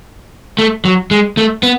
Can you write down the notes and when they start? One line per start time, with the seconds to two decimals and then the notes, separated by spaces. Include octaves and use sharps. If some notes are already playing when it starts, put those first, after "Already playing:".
0.58 A3
0.85 F#3
1.11 G#3
1.37 A3
1.63 B3